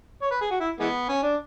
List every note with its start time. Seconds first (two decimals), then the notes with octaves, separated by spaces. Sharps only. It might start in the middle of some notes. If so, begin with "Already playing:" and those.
0.22 C#5
0.31 B4
0.41 G#4
0.51 F#4
0.60 E4
0.80 E3 G#3 B3
1.09 C#4
1.22 D4